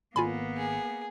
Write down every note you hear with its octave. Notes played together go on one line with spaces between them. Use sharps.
G#1 A#3 B3 F4 G#5 B5
G#4